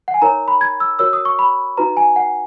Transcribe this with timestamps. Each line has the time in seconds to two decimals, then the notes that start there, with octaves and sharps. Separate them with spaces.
0.08 F#5
0.14 G#5
0.22 D#4 A#4 C#5 A#5
0.48 B5
0.61 G#6
0.80 E6
0.99 F#4 A#4 C#5 E6
1.13 D#6
1.25 C#6
1.39 B5
1.77 D#4 F#4 B4 A#5
1.97 G#5
2.16 F#5